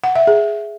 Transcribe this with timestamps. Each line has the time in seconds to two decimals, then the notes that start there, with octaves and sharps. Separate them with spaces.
0.04 F#5
0.15 E5
0.27 G#4